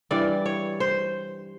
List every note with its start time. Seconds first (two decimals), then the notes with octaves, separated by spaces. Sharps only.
0.11 G2 E3 G3 D5
0.46 C#5
0.80 C5